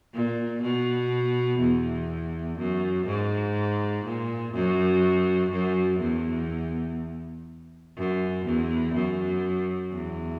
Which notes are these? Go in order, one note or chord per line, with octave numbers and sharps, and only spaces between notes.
A#2
B2
E2
F#2
G#2
A#2
F#2
F#2
E2
F#2
E2
F#2
E2